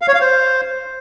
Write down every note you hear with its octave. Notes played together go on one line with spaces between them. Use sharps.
F5
C#5
F5
C5